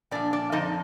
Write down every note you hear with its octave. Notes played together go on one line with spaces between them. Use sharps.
A#2 F3 D4 D5
D4 D5
F2 D3 F3 D#4 D#5